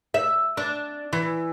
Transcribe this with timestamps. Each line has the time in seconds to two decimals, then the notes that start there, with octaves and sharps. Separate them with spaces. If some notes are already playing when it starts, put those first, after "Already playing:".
0.14 E5
0.57 D4
1.13 E3